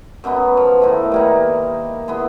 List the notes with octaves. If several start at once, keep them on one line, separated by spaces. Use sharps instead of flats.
F#2 B2 F#3 B3
F3
A2 D#3 E4
G3 A#3 D#4
B3 E4 G#4 C6